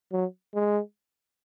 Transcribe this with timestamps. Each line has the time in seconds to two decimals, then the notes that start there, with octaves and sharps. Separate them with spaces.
0.12 F#3
0.55 G#3